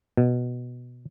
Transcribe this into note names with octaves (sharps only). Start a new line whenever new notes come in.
B2